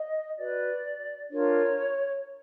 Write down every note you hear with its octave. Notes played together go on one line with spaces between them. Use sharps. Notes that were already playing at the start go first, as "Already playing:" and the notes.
Already playing: D#5
F#4 B4 D5
D4 F4 A#4 C#5